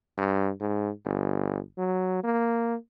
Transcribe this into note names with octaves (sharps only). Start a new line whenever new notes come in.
G2
G#2
G1
F#3
A#3